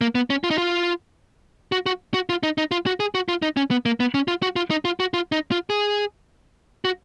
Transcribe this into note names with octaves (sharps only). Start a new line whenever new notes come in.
A#3
B3
C#4
F4
D#4
F4
F#4
F#4
F#4
F4
D#4
D#4
F4
F#4
G#4
F#4
F4
D#4
C#4
B3
A#3
B3
C#4
F4
F#4
F4
D#4
F4
F#4
F4
D#4
F4
G#4
F#4